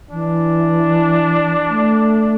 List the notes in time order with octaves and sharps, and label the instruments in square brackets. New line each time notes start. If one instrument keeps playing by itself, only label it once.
[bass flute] E3 [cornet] D4
[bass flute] A3